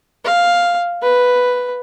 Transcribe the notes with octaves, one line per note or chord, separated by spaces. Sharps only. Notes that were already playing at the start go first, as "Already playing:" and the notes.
F5
B4